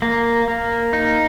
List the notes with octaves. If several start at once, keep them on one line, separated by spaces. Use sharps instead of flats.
A#3
A#3
D#4